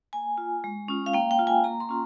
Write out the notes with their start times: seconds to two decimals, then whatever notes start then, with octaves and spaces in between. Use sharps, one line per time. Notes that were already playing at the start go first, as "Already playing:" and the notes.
0.13 A#3 G#5
0.38 F4
0.64 G#3
0.88 C#4 F4
1.06 F5
1.14 A#3 G5
1.31 G5
1.39 F4
1.47 G#5
1.64 A#3 A#5
1.80 C6
1.89 C#4 F4